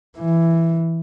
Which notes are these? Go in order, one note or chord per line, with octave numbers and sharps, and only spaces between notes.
E3